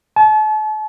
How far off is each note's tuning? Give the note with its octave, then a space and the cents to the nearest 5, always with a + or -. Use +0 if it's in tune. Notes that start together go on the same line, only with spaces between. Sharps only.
A5 -40